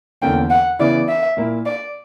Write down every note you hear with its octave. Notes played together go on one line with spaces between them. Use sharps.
E2 D3 A#3 C#4 G5
F#5
C#3 E3 B3 E4 D5
E5
A#2 A#3 E4
D5